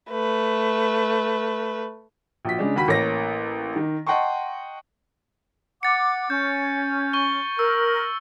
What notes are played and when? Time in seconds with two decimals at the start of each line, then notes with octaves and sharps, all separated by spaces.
0.11 A3 B4
2.45 A#1 F#4 B6
2.59 C#3 G#3 D4
2.76 D#2 F#4 B5 B6
2.88 A1 A#3 C#5 A#6
3.76 D#3
4.07 D#5 F#5 G5 A5 C6 C#6
5.83 F#5 D6 A6 C#7
6.30 C#4 G6
7.13 C#6 G7
7.59 A#4 E6